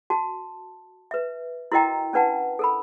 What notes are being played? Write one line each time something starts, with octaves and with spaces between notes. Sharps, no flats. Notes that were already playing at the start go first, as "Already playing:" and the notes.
F#4 A5
B4 E5
E4 F#4 A#4 D#5 G5 A#5
C#4 D4 B4 F#5 A5
A4 A#4 B5